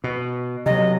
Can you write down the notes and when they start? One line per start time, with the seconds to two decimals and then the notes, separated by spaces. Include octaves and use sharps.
0.04 B2
0.66 C3 F#3 D#5